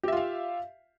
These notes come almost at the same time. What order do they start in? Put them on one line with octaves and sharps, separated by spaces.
G4 E5 F4 F5